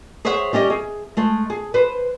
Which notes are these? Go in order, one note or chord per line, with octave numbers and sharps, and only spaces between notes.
G#4 C5 C#5 E5 F#5
G3 C#4 G4 D#5
G#4
G#3 A3
G#4
B4 C5